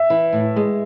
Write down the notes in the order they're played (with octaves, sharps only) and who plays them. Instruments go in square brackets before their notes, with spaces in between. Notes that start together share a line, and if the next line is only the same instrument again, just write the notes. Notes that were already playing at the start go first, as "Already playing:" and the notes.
Already playing: [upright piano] E5
[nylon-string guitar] E3
A2
G#3